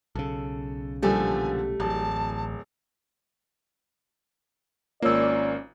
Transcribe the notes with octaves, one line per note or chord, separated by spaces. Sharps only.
B1 C#3 A4
A#2 D3 F3 G3 A3 G4 G#5
D1 A1 A5
G#1 A#3 C#4 F4 C#5 D5 E6